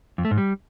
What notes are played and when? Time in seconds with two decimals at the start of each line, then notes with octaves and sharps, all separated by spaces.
0.18 F2
0.25 A3
0.31 G#2
0.38 G3